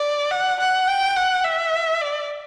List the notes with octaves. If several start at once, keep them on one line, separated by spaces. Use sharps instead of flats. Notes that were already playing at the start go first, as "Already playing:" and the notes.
Already playing: D5
F#5
F#5
G5
F#5
E5
D5